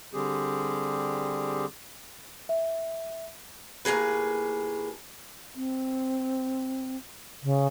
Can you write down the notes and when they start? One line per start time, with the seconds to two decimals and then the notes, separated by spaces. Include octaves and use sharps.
0.14 D3 G3 C4 G4 G#4
2.49 E5
3.85 D#2 A2 A#3 G#4 B4
5.56 C4
7.43 C#3